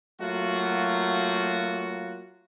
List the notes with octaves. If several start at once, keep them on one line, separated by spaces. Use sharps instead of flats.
F#3 A3 A#3 F4 F#4